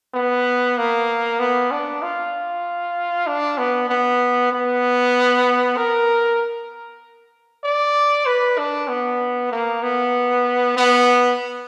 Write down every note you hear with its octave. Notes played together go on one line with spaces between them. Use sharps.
B3
A#3
B3
D4
F4
D4
B3
B3
B3
A#4
D5
B4
D4
B3
A#3
B3
B3